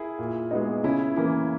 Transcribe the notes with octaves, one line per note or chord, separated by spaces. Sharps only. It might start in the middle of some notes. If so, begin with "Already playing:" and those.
Already playing: E4 G#4 A#4
A#2
G#3 B3 D#4
C#3 C#4 E4
E3 A#3 C#4 E4